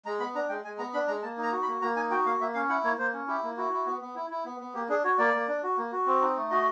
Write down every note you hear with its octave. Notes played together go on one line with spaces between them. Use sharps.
G#3 A#5
B3 B5
D4 A#5
G#3 G5
G#3 G#5
B3 A#5
D4 B5
G#3 A#5
A#3 A5
D#4
A#5
F#4
B5
A#3
A#3 A#5
D#4 G#5
F#4 G5
A#3 F5
A#3 E5
C#4 F5
E4 F#5
A#3 C#5
A#3 C5
C#4
E4 G4
A#3
E4 F#4
E4
B3
B3
E4
E4
B3
B3
A#3 G4
D4 G#4
F#4 C#5
A#3 D5
A#3
D4
F#4
A#3
F#4
C4
D#4
A3
F#4 D#5